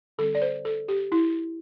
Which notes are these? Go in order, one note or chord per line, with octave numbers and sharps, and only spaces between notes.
D3 G3 C4 A4
D5
C5
A4
G4
E4